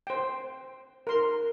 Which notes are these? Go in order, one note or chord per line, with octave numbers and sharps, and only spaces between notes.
C5 G5
A#4 C6